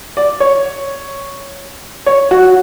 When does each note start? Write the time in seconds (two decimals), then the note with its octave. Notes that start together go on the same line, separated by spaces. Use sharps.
0.17 D5
0.40 C#5
2.06 C#5
2.31 F#4